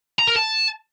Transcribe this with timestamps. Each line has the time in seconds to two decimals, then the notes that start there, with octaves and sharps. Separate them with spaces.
0.19 A#5
0.28 A#4
0.36 A5